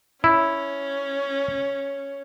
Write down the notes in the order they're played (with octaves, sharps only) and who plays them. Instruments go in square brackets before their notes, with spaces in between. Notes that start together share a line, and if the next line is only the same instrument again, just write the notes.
[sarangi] C#4 [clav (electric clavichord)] E4